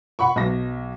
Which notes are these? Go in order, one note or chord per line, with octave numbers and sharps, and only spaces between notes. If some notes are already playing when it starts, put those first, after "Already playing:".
F#5 B5 C#6
B1 A#6